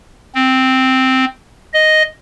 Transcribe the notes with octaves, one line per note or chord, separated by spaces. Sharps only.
C4
D#5